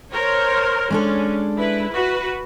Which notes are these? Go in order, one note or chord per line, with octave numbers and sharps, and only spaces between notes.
A#4 C5 C#5
G#3 C#4 D4 A4
E4 B4
F#4 B4